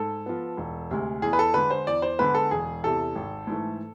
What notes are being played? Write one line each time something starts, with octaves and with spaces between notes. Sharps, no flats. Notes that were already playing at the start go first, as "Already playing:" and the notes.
Already playing: G#2 A4
F3 B3
E1
D2 C3 G#3
E2 G#4
B4
A4
D3 G#3 B4
C5
E2 D5
C5
D3 G#3 B3 B4
A4
E1 G#4
E2 C3 A4
G#1
G#2 E3 A3